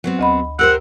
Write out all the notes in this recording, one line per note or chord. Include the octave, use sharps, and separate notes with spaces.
F#3 B3 C4
D2 D#5 B5
G4 A#4 C5 F#5 E6